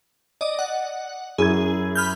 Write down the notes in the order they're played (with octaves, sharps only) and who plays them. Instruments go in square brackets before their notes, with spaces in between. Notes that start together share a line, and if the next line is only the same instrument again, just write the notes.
[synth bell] D5 D#5
F#5
[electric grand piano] F#2 E4 G#6 [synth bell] G#4
[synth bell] B5 F6 G6